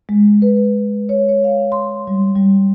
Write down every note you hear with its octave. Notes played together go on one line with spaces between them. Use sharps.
G#3
B4
C#5
C#5
F5
C6
G3
G3